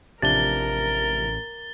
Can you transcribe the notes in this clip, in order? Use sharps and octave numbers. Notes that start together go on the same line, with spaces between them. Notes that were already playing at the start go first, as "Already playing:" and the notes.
A1 C3 F3 D4 A#4 A6 G7